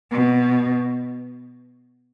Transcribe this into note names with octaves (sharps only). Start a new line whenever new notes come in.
B2